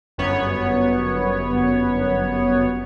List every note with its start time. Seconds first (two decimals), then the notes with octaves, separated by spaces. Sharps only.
0.18 G1 F#2 B3 C#5